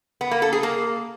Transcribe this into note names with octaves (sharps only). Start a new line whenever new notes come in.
B3
A#3
A4
G#4
A#3